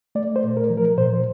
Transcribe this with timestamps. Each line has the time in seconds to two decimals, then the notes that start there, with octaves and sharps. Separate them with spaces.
0.15 A3 D5
0.36 C5
0.43 A#2
0.57 A#4
0.70 F3
0.77 A#4
0.98 A#2 C5